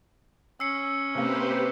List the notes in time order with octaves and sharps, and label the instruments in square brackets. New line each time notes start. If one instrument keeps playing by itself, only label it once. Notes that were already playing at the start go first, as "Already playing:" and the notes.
[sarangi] C#4 [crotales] E6 C7 C#7
[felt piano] C3 A#3 [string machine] G4 B4 C5